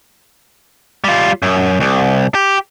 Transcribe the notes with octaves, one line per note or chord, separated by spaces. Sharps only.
G3 F4
F#2
C2
G4